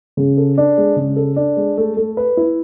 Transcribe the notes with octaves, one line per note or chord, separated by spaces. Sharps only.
C#3
A4
D4
G#3
C#3
A4
D4
G#3
A3
A3
B4
E4